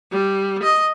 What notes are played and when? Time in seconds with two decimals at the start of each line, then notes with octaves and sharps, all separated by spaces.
0.12 G3
0.63 D#5